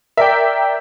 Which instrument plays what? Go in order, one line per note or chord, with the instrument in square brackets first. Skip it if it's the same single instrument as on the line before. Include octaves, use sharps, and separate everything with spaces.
[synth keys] A#4 D5 G5 [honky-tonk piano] E5